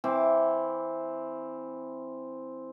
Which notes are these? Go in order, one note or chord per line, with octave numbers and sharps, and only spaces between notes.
E3 C4 D6